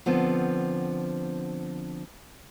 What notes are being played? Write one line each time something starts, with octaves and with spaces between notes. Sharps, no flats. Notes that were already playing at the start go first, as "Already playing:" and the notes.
D3 F3 B3 C4